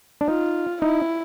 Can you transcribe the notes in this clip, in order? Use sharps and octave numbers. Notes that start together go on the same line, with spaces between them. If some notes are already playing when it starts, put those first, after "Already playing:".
D4
D#4 F4
D#4 E4